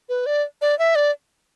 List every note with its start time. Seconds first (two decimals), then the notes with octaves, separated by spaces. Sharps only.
0.09 B4
0.26 D5
0.62 D5
0.79 E5
0.95 D5